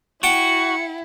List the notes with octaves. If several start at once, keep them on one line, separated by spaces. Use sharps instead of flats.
E4 F#4 F#5 G5 A5 C#7